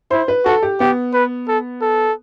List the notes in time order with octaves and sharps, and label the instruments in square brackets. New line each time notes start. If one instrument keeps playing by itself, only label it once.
[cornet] E4 [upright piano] C5
[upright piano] B4
[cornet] F#4 [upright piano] A4
[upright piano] G4
[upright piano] B3 [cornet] G4
[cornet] B4
A4
A4